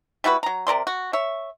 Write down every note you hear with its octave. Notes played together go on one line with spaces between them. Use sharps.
G3 E4 F#4 B4
F#3 A#5
C3 A#4 D5 C6
F#4
C#5 E5